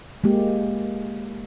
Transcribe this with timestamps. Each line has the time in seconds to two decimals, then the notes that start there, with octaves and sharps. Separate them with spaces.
0.24 G#3 A#3 G4